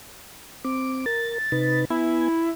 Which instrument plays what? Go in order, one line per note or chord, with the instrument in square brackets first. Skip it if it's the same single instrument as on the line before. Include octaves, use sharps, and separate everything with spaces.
[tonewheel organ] C4 D6
[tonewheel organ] A#4 [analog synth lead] A6
[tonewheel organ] C3 D#4 B4
[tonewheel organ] B3 G#5 [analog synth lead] E4